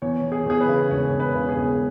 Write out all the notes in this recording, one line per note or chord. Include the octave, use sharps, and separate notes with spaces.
E2 C#5
E2
G#4
E2 G#4
B4
C#3
E1 C#5
E1
B4
C#3
G#4
E1